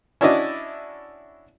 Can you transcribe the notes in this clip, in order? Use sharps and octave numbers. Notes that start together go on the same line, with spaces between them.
C#4 D4 E4 F#4 D5 D#5